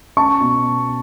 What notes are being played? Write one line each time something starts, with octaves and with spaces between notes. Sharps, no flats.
C#4 A5 C#6
B2